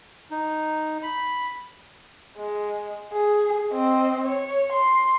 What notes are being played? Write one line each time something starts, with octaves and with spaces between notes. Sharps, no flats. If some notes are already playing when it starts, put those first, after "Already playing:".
D#4
B5
G#3
G#4
C4 D#5
C#5
C6